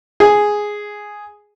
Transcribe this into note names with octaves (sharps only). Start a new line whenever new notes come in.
G#4